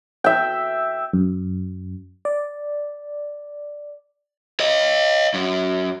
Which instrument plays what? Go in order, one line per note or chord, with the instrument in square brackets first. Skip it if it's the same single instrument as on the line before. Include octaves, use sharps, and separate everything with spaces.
[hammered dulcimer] E5 G5
[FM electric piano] F#2
D5
[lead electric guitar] C#5 D#5
F#2